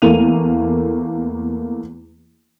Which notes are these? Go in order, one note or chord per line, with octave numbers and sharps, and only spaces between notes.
E2 A3 A#3 E4 D#7 F7